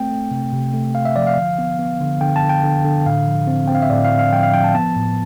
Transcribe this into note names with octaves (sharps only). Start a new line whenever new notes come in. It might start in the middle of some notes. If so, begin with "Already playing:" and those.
Already playing: A3 C4 G5
A3
C3
C3
A3
A3 F5
E5
F3 D5
F5
D3
B3
B3
D3
D3 G5
A5
D3
G5
D3
D3
A2 F5
F3
C4
C4 G5
F5
E5
A2 D5
F5
C4
F5
F3 G5
F5
F3 G5
A5
B3 A5
A2